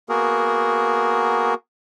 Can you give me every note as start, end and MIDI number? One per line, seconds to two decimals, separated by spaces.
0.09 1.54 58
0.09 1.54 59
0.09 1.54 66
0.09 1.54 68
0.09 1.54 70